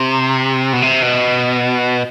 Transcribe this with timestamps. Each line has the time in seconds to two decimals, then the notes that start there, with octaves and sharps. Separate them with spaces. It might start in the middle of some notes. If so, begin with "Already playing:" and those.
Already playing: C3
0.73 B2
0.82 C3
1.02 B2